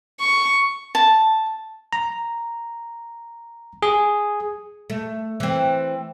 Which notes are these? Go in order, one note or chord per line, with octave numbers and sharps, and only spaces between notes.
C#6
A5
A#5
G#4
A3
E3 C4